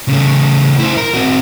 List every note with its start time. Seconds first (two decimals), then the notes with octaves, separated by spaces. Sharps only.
0.08 C#3 A3
0.79 E4 C5
0.97 A#4
1.14 C4 F#4